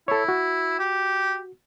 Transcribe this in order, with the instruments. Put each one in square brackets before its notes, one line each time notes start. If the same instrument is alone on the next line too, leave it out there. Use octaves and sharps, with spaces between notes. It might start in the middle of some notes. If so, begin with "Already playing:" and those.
[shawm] E4 [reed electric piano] A4 C#5
[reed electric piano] F#4
[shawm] G4